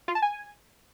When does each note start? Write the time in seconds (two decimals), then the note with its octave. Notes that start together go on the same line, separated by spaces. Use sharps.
0.08 F4
0.15 A5
0.22 G#5